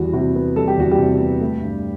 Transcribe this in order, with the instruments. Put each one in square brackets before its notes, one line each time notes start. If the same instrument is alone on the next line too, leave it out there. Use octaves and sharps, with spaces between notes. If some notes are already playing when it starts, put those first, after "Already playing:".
Already playing: [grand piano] E2 G3 F#4
C3 F#4
B3
G3 A4
G4
E2 F#4
G3 G4
C3
B3
A3
G2